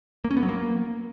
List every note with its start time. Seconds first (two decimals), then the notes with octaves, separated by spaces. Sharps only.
0.24 A#3
0.31 C#4
0.37 B3
0.43 F#3
0.49 A#3